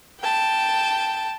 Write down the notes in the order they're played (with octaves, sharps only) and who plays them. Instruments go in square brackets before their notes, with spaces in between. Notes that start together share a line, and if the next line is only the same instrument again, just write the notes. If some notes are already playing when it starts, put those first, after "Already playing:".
[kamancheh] G5 A5